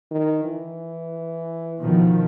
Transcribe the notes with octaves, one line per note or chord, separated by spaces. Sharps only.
D#3
E3
B2 D#3 F3